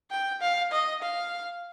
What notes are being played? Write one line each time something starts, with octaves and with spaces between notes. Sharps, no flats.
G5
F5
D#5
F5